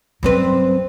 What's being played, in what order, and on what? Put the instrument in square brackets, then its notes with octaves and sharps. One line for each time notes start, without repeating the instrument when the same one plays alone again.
[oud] G2 C4 B4 [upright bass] F#3 C#4